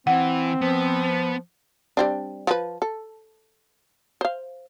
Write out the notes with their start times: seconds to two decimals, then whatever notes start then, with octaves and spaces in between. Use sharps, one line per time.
0.07 E3 C4 F#5
0.61 F3 B3
1.97 G3 C4 D4
2.47 F3 B4
2.82 A4
4.21 C5 F5